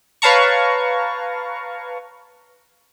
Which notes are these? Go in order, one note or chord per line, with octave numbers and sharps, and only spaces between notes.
B4 C#5 F5 A5 A#5 C#6